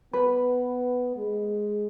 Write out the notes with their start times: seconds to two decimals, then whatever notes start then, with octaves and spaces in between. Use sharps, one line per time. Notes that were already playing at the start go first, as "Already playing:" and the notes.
0.13 B3 B4
1.17 G#3